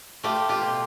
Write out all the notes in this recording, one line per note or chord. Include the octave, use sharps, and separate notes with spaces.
A3 F4 G4
F4 G4
B2